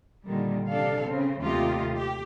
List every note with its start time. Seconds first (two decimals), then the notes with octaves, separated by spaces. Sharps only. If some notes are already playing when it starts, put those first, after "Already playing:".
0.25 A#2 D3 D#3 G3
0.69 C3 D4 A4 F5
1.07 C#3 C4
1.42 D#2 C3 A3 F4 G4 D#5
1.94 G4